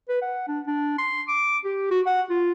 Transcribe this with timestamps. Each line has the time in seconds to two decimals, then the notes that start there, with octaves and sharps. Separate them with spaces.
0.09 B4
0.22 F#5
0.48 D4
0.67 D4
0.98 C6
1.28 D6
1.65 G4
1.91 F#4
2.06 F#5
2.30 F4